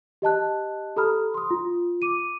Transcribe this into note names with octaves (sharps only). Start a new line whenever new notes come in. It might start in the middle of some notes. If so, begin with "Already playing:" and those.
G4 D#5 A5 F#6
G4 A4 A#5 B5 D#6 F6
C6 D#6
F4
D6 D#7